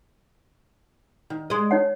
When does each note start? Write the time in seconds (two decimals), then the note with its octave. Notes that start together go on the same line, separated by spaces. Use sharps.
1.30 D#3
1.50 G#3 D#5
1.71 D#4 C#5 F#5